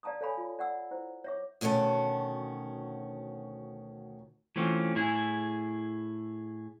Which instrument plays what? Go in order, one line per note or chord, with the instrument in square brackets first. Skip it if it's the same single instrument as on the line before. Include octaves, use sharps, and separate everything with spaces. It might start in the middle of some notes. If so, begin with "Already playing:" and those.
[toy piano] D5 F5 A5 A#5 D#6
A4 C#5 F5 G#5 B5
F4
D5 F#5 E6
E4 C5
C#5 E5 D6
[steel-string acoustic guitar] D2 B2 D#3 C#4 A5
[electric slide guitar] E3 A3 C4 C#4 F4
A2 E4 G#4